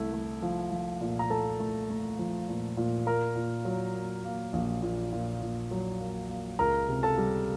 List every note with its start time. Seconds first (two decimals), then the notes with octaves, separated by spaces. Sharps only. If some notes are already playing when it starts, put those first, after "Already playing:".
Already playing: C2 A3 E4
0.13 A3
0.42 F3
0.71 F3
1.01 A#2
1.19 A#5
1.30 A3 A4 A5
1.60 A3
1.90 A3
2.19 F3
2.48 A#2
2.77 A#2
3.07 A#3 A#4 A#5
3.36 A#2
3.65 F#3
3.94 A#3
4.25 A#3
4.53 A#1
4.82 A#2
5.12 A#2
5.42 A#2
5.71 F#3
6.00 A#3
6.29 A#3
6.59 C#2 A#4 A#5
6.88 C3
7.03 A4 A5
7.18 G3